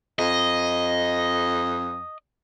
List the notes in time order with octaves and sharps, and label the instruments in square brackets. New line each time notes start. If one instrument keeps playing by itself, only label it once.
[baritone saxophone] F2 [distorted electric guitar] D#5